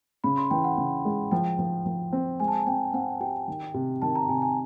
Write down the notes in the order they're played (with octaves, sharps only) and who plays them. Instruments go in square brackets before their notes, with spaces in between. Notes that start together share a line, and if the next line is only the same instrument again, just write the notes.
[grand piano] C#3 [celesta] B5
[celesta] C6
[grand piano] E3 [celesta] G5
[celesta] F#5
[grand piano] C#3
G#3
[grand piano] F3 [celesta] G5
[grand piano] F3
F3
C4
[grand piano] G#3 [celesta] G#5
[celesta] A5
G#5
[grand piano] C4 [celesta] G5
[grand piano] C4 [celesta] F#5
[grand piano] G4 [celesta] G5
[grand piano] D#3
C3
[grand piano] D#3 [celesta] A5
[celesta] A#5
[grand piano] C3 [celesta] G#5
[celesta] G#5